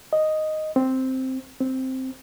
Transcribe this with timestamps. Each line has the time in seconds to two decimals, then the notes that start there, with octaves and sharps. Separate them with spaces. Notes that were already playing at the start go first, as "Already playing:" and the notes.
0.13 D#5
0.76 C4
1.60 C4